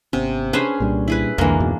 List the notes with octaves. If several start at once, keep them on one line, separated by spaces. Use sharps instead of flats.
G#1 C3 B3 C#4
C#4 D4 G#4 B4 C5
C2 A#2 G3 D4
E4 G#4 B4
C2 F2 D3 E3 G#3 A#3 D4 A#4
D1 G#2 B2